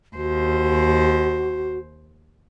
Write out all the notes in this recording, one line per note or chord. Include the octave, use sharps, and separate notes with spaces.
D#2 F#4 C5